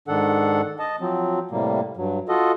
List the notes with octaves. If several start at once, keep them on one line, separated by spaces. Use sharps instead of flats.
G#2 D#3 D4 A4 F#5
D#5 A5
F3 F#3 C4
A2 C3 G3 A#3
G2 F#3
F4 F#4 A4 D#5